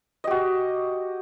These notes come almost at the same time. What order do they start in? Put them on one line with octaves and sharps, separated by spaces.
D#5 G4 F#4